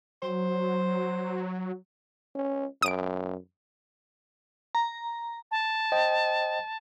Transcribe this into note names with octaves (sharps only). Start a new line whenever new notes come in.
F#3 C5
C#4
F#2 D#6 D7
A#5
A5
C5 D#5 G5